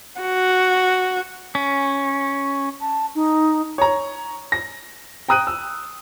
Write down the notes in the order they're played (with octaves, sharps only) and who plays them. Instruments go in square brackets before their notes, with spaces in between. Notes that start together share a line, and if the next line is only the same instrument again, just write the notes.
[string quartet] F#4
[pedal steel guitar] C#4
[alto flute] A5
D#4
[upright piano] C#5 A#5
A#6
G5 A#5 D#6 F#6 D#7
E6